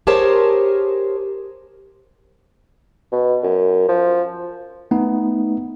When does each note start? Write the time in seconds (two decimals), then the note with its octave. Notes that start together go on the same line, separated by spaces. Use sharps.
0.07 G4 G#4 A#4 C5 C#5 A5
3.12 B2
3.43 F#2
3.88 F3
4.91 A3 B3 D#4